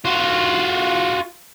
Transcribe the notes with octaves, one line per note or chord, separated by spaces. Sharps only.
F4 F#4